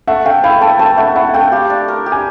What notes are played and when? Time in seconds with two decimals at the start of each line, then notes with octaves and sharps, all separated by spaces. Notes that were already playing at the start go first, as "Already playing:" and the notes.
0.07 A3 E5 F#5
0.25 A3 F5 G5
0.44 E4 F5 G5
0.61 A3 G5 A5
0.79 A3 G5 A5
0.97 A3 E5 F#5
1.16 E4 E5 F#5
1.33 A3 F5 G5
1.52 G4 F5 G5
1.70 D4
1.88 A#4
2.06 G4
2.12 G#5